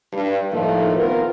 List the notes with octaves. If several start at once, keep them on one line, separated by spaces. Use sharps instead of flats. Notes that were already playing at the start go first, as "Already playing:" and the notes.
G2
A2 D#3 F3 A3 A#3 D#4
B3 C4 F4 A#4